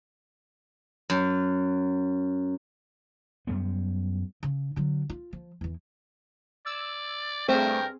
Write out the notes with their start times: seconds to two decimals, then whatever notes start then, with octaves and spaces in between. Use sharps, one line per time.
1.10 F#2
3.47 F#2 G3 B3
4.43 C#3
4.76 D3 F#3
5.10 F4
5.33 F3
5.61 E2 E3
6.66 D5 E6
7.48 G2 A3 C4 G#4 A#4 C5 E5 G5